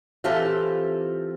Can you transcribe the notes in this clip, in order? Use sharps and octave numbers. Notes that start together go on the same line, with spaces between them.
E3 C4 F4 G4 A4